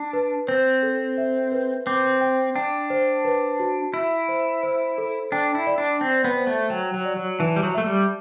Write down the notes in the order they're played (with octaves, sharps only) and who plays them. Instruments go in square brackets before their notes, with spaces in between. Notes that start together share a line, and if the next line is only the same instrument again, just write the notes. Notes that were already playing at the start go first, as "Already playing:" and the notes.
Already playing: [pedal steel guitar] D4
[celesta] B4
[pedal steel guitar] C4 [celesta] C5
[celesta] A4
E5
B4
[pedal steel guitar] C4 [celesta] D6
[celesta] G5
[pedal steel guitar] D4 [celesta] G5
[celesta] C5
B4
F#4
[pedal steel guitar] E4 [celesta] E5
[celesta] C5
C5
A4
[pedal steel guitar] D4 [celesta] G5
[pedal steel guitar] E4
[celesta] D5
[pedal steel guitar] D4
[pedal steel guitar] C4 [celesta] G5
[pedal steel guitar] B3
[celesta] C5
[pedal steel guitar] A3
[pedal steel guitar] F#3 [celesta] G5
[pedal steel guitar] F#3
[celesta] D5
[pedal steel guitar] F#3
[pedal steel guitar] E3 [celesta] A5
[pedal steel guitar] G3
F#3
[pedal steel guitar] A3 [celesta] E5
[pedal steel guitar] G3